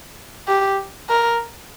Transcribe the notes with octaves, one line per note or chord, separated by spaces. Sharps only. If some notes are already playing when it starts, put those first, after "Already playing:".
G4
A#4